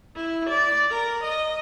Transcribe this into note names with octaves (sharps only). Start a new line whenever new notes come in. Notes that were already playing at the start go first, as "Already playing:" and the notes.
E4
D5
A#4
D#5